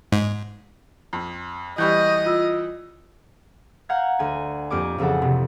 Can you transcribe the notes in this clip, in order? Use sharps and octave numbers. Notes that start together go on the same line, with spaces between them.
G#2
F2
E3 G3 D#5 B5 C#6 G6
F4 E6
F5 F#5 A#5 G6 G#6
D2 G#5
F2 A#3 G4 C#5 G#5 D6
A1 F2 C#3 A4 F#5
C3